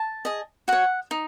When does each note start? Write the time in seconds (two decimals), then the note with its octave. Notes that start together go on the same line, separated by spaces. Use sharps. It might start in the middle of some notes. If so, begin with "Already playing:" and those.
Already playing: A5
0.25 G#4 D#5
0.68 F#4 C#5 F#5
1.11 D#4